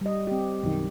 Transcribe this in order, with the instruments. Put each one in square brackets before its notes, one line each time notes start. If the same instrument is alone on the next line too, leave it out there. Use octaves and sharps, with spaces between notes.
[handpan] G3 D#5
C4 G4
[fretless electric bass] B1 F#2 D#3